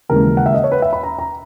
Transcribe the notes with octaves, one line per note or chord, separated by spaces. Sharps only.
D#2 C#3 E3 G#3 A#4
F#5
E5
D#5
C#5
B4
E5
B5
A#5
A#5